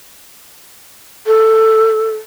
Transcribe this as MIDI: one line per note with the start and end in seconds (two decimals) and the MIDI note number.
1.27 2.11 69